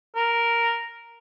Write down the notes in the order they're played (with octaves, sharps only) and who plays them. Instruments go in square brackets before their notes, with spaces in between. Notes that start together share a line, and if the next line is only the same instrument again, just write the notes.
[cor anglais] A#4